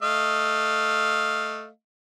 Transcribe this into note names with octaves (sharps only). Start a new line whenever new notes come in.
A3 D#5 F5